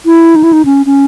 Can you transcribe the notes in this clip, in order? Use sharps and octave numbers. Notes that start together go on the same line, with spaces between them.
E4
D#4
E4
D#4
C#4
C#4